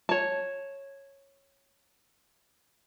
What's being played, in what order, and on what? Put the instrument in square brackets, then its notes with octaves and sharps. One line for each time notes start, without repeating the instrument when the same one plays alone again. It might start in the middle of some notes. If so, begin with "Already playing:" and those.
[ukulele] C#5 A5